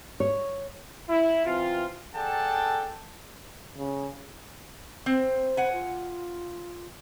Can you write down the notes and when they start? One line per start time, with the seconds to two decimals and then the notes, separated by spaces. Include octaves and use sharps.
0.20 C#5
1.09 E4
1.46 C3 E3 C4 F4
2.15 G#4 A4 D5 F#5 G5 A5
3.78 C#3
5.06 C4 C5
5.57 F#5 G#5
5.73 F4